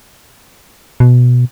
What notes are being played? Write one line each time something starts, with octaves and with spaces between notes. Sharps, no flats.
B2